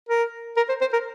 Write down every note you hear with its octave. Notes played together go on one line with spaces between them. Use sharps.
A#4
A#4
C5
C5
A#4